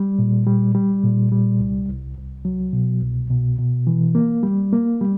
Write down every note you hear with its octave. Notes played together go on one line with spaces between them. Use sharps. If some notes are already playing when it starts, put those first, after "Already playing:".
Already playing: G3
A#2
G3
G3
A#2
G3
C2
C2
C2
F#3
B2
C2
B2
B2
E3
A#3
G3
A#3
G3